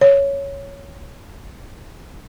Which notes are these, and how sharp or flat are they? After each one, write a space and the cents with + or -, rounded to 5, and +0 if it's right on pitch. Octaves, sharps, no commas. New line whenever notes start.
C#5 +5